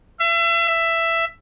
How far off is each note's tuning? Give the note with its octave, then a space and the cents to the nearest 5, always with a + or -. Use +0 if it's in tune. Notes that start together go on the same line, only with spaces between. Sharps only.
E5 +35
E5 +10